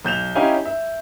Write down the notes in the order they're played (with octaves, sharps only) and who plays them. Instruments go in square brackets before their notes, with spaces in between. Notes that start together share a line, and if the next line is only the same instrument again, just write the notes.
[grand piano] B1 G6 E7 F7
C#4 D#4 E4 G4 F5 G#5
E5